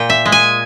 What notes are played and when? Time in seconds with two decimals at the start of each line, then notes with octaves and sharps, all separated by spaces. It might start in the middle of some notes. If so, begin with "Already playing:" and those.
Already playing: A#2 G5
0.10 E5
0.25 G#3
0.32 G#5